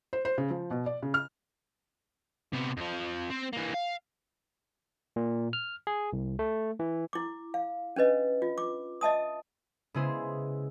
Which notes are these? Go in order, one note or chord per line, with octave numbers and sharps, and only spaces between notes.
C5
C5
C#3
F3
B2
D5
C#3
F6
C3 B3
F2 F3
C4
E3 A#3
F5
A#2
F6
G#4
C2
A3
E3
E4 D6
F5
C#4 D4 B4 D#5
F4
D6
D#5 E5 A5 D#6
C#3 G#3 B3 E4 G#4 C5